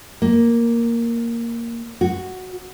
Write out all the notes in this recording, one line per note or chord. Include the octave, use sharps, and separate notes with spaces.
A#3
F#4